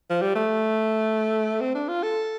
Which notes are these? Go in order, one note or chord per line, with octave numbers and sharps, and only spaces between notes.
F3
G3
A3
C4
D4
F4
A4